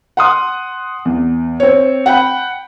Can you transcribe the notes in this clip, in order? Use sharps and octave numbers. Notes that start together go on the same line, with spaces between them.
F#5 C6 D#6
E2
C4 C#5
F#5 G5 B5